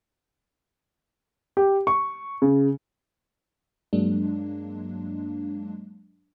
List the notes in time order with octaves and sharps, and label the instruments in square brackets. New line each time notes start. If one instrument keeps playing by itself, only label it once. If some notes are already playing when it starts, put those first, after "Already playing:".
[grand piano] G4
C#6
C#3
[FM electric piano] G2 F#3 G#3 A#3 D4